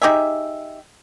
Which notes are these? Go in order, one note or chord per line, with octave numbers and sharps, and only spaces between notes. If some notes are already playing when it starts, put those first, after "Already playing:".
D#4 G4 G#4 E5